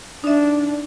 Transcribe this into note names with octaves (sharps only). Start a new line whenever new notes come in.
D4 D#4 E5